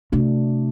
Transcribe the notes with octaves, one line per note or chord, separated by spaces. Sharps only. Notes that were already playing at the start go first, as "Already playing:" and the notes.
C3 A3 D4 F#4